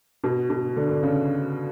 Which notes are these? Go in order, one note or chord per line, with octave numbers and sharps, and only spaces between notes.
B2
B2
D3
D3
C#3